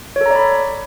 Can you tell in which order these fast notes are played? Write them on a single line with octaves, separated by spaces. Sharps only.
C#5 A4 A#5 D5 B5